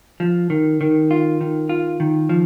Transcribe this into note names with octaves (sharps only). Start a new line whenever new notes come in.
F3
D#3
D#3
F4
D#3
F4
D#3
F3